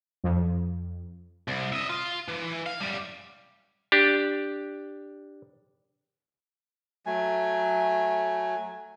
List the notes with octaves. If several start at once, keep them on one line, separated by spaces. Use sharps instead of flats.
F2
C2
D#5 E5
F4
E3
F5
F#2 G3
D4 G4
F#3 A3 G#5